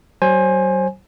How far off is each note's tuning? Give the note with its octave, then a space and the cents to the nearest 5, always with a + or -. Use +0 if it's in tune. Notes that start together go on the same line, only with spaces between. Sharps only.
F#3 +40 C5 +25 G#5 +0